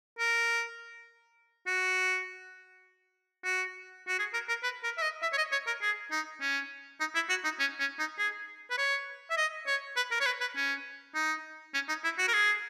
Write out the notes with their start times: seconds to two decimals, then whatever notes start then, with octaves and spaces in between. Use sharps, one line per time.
0.19 A#4
1.67 F#4
3.44 F#4
4.08 F#4
4.19 G#4
4.34 A#4
4.48 A#4
4.63 B4
4.83 A#4
4.98 E5
5.02 D#5
5.22 E5
5.33 C#5
5.37 D#5
5.52 C#5
5.67 A#4
5.82 G#4
6.11 D#4
6.41 C#4
7.00 D#4
7.15 E4
7.29 F#4
7.44 D#4
7.59 C#4
7.80 C#4
7.99 D#4
8.19 G#4
8.71 B4
8.78 C#5
9.30 E5
9.37 D#5
9.67 C#5
9.96 B4
10.11 A#4
10.20 C#5
10.26 B4
10.41 B4
10.56 C#4
11.15 D#4
11.74 C#4
11.89 D#4
12.04 E4
12.18 F#4
12.28 A#4
12.33 G#4